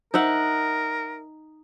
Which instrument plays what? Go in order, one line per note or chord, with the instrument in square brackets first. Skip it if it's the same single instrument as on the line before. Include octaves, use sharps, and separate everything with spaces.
[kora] D#4 E5 F#5 [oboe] A#4